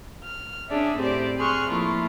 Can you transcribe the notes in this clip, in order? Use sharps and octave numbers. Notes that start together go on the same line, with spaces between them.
F6
C#4 D4 G#4 D5 E5
A2 C4 G4 C5 D5
G#4 C6 C#6 F6 F#6
F3 A3 A#3 E4 F4